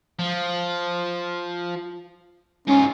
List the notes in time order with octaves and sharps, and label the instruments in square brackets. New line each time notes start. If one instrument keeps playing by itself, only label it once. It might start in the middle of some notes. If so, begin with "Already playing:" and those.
[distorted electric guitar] F3
[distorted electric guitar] G#2 F4 [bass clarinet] C#4